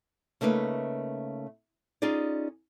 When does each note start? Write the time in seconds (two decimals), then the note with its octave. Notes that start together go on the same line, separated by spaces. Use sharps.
0.41 C#3 A3 A#3 D#4 B4
2.02 C#4 D#4 F4 G#4 D5